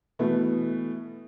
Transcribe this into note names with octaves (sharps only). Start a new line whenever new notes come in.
B2 E3 A3 B3